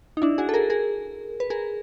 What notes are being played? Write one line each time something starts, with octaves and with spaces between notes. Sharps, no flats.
D#4
D4 E4
F#4 G#4
A4
G#4 A#4
G#4 A#4
B4
G#4 A#4